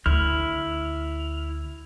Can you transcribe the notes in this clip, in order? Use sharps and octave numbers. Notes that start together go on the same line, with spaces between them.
D2 E4 F6